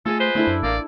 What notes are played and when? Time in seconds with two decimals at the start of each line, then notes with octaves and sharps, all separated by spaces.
0.06 A3 F4 G#4 A4 D#5
0.20 B4 C5
0.35 A3 D4 E4 A4
0.47 F#2
0.63 A1 A#3 D5